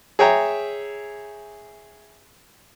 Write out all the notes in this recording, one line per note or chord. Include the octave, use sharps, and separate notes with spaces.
G#4 C#5 E5 G5 A#5